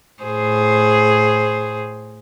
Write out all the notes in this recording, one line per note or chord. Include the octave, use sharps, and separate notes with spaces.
A2 G#4 C5